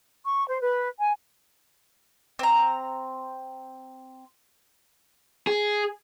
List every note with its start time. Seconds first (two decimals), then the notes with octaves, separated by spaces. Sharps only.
0.25 C#6
0.47 C5
0.61 B4
0.99 G#5
2.39 C4 A#5
5.47 G#4